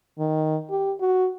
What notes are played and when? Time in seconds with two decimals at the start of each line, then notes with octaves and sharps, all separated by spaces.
0.19 D#3
0.70 G4
1.01 F#4